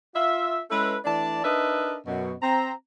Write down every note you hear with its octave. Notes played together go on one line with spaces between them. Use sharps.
F4 E5
G#3 C#4 E4 A4 B4
E3 A3 D4 D5 A5
D4 D#4 A#4 B4 D#5 E5
F#2 B2
C4 A#5